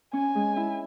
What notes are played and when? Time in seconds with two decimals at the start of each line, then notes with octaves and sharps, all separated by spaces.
0.13 C#4 G#5
0.35 G#3
0.56 E4